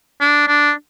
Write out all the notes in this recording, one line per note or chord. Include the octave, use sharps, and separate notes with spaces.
D4
D4